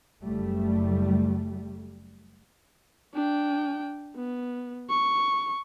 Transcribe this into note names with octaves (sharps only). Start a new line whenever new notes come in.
F#1 G3 A3
D4 G5
B3
C#6